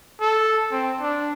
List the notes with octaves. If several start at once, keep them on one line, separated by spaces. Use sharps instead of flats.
A4
C4
D4